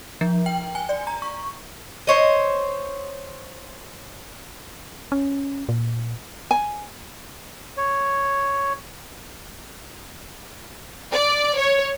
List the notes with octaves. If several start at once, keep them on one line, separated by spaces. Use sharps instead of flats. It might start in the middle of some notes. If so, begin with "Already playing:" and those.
F3
G5
G#5
D5
A#5
C#6
C5 C#5 D#5
C#4
A#2
G#5
C#5
D5
C#5